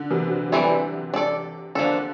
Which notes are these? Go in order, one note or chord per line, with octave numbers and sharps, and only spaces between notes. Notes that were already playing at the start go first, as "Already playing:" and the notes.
Already playing: D3
C3 E3
C3
C3 E3 G3 C4 E4 A4
D4 A4 D5
D3 F3 A#3 D4 A4